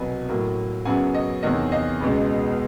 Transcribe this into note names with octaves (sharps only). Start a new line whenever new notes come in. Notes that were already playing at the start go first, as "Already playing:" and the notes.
Already playing: C2 B2 F#3 B3 G#5
A2 F#3 A#3
F#2 C#3 F#3 B3 F#5 G#5
C#5 D#5
E2 C3 D#3 C#5 D#5
D#5 F5
C#2 B2 G#3 B3